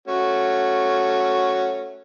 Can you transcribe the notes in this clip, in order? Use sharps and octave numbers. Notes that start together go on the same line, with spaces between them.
A3 C#4 F#4